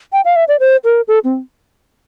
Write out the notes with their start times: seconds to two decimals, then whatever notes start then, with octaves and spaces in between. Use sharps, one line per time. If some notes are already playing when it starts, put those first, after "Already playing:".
0.13 G5
0.25 F5
0.36 E5
0.48 D5
0.60 C5
0.84 A#4
1.08 A4
1.24 C4